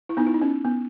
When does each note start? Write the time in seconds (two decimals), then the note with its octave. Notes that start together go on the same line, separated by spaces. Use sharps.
0.09 E4
0.17 B3 D#4
0.27 E4
0.34 D#4
0.42 C#4
0.65 B3